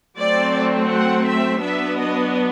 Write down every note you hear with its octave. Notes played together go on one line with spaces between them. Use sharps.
F#3 A3 C4 D5
F#5
E5
F#3 B3 D4 E5
D#5